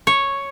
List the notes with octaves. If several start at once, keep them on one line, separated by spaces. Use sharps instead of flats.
C#5